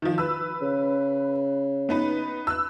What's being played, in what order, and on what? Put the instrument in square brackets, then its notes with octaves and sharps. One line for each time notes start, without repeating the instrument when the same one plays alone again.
[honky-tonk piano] D#3 F3
B4 E6
[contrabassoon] C#3
[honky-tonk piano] B3 D#4 B4
E6 F#6